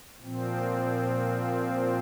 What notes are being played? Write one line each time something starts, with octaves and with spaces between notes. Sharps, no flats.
A#2 F3 C4